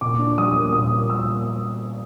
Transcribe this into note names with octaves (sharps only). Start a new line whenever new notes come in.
A#2 D6
D4
G3 D#6
A#3
A#2 D#6
A#3
G3 E6
A#3